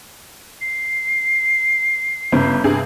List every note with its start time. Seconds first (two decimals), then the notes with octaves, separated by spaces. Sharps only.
0.60 C7
2.32 G1 C#3
2.64 G2 C3 G#4